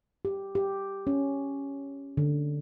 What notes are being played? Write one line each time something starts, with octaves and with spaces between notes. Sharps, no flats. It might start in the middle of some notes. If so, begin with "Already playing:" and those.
G4
G4
C#4
D3